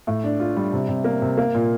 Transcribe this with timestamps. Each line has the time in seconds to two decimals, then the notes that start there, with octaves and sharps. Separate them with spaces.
0.07 A2
0.24 D4
0.40 F4
0.57 G3
0.73 C3
0.89 C3
1.04 A#3
1.22 C3
1.38 A#3
1.54 A#2